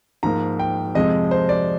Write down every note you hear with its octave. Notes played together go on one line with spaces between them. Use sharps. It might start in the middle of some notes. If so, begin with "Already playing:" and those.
G#2 F3 A#3 A#5
G5
F2 C3 F3 G#3 D#5
C5
D5